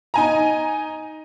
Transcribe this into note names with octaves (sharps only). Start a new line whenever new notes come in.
D#4 G#5 A#5